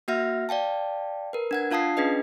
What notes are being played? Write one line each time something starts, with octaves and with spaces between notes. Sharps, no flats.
A#3 F#4 E5 F#5 F6 A#6
D5 F5 G5 A5
A#4 B4
D4 F#5 G#6
D4 F4 F5 A5 D#6 C7
C#4 D4 G#4 B4 D#5